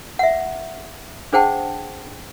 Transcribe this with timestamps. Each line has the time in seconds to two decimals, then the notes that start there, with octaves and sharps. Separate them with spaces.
0.19 E5 F#5
1.33 D4 G#4 C5 F#5 G5 A5